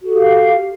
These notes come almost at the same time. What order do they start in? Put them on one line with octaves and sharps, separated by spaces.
F#4 A4 G4 F5